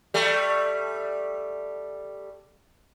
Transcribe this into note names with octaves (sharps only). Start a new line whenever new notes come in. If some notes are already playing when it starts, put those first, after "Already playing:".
G3 A3